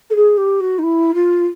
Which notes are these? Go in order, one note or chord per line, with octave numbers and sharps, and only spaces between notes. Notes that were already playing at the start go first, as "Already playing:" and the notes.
A4
G#4
G4
F#4
D#4
E4
F4